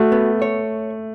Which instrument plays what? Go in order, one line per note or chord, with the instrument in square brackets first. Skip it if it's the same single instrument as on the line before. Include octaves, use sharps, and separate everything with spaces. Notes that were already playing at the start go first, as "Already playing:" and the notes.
Already playing: [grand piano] A3 [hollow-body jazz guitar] F#4
[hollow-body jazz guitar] B3
C#5